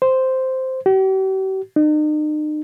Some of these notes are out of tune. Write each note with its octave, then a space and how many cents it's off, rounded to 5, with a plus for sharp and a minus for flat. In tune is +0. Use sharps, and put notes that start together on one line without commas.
C5 -5
G4 -45
D#4 -40